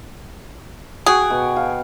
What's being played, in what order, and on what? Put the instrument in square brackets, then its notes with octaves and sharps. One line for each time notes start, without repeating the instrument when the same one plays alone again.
[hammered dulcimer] F#4 G5 [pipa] G#4
[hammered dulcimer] B2
F5